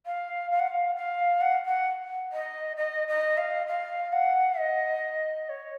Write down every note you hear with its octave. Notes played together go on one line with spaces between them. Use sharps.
F5
F5
F#5
F5
F5
F#5
F#5
D#5
D#5
D#5
F5
F5
F#5
D#5
C#5